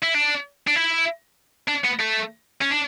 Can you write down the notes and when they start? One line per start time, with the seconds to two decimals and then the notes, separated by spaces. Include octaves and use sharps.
0.02 E4
0.14 D4
0.67 D4
0.76 E4
1.68 D4
1.84 B3
1.99 A3
2.61 C#4
2.70 D4